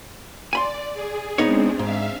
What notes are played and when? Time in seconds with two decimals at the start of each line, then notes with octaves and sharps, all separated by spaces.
0.53 D5 G#5 B5 C6
0.93 G#4
1.38 G#3 B3 C4 D4 D#4 C#5
1.79 G#2 E5 F5